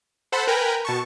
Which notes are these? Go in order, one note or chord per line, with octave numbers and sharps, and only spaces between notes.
A4 C5 F#5 A5 B5
A#4 B4 G5 G#5 A#5 B5
B2 A5 C#6